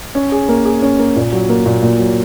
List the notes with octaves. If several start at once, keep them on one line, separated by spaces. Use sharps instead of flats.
C#4
G#4
A#3
G#4
C#4
A#3
A#2
F#3
A#3
A#2
A#2
F#3